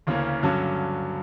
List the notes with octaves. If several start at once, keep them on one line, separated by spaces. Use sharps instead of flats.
D2 C#3 E3 A#3 C#4
G2 D3 F#3 C#4